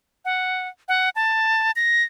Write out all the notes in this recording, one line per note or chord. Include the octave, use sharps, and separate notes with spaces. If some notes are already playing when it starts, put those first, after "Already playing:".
F#5
F#5
A5
A#6